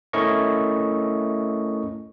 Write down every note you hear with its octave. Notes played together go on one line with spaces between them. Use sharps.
A3 C#4 E4 A#4 D#5 C#6